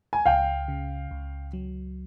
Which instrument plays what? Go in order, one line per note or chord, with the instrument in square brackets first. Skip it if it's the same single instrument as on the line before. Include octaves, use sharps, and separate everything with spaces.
[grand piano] G#5
[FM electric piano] C#2 [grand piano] F5 G5
[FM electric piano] C#3
C#2
F#3